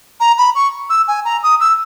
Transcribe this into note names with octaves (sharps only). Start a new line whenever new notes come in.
A#5
B5
C#6
E6
G#5
A#5
D#6
E6